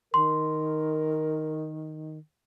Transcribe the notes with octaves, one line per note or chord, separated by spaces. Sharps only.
D#3 A#4 C6